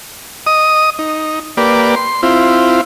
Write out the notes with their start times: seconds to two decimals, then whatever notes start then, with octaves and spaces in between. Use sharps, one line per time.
0.47 D#5 D#6
0.99 D#4
1.57 A#3 G4 B4 D5
1.96 C6
2.23 C4 E4 F4